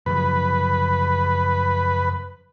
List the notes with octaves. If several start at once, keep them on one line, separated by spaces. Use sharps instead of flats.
F#2 C#3 F3 B4